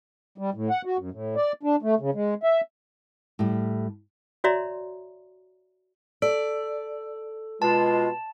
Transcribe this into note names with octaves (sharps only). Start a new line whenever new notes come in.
G3
A2
F#5
F#4
F#2
A2
D5
D4
A3
C#3
G#3
E5
A2 G3
F#4 C#5 D5 E5 A#5 C6
A4 D5
B2 G#3 F4 A5